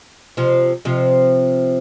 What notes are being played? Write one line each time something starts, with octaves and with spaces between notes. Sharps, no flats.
C3 F3
C3 F3